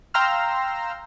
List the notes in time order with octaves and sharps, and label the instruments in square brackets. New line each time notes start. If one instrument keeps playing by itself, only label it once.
[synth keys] F5 G5 A#5 C6 E6 F6